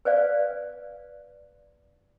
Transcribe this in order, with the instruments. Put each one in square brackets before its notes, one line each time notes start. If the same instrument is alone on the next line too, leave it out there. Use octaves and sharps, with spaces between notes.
[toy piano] B4 C5 D5 F5